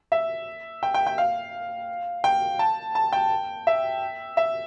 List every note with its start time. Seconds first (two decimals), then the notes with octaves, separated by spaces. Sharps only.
0.12 E5
0.83 G5
0.94 G5
1.07 G5
1.18 F5
2.24 G5
2.59 A5
2.95 A5
3.13 G5
3.67 E5
4.37 E5